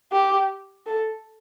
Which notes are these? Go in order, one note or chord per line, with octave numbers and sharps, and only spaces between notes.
G4
A4